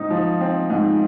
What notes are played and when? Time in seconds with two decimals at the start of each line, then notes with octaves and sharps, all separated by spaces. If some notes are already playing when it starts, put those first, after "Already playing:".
Already playing: G#2 C4 D#4
0.10 F3
0.41 C4
0.70 G#2